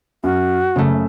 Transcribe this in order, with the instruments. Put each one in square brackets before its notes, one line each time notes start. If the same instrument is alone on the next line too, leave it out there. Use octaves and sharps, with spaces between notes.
[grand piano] F#2 [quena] F#4
[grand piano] F#2 [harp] C#3 A3